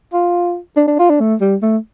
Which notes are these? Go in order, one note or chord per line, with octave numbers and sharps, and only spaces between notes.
F4
D4
D4
F4
D4
A3
G3
A3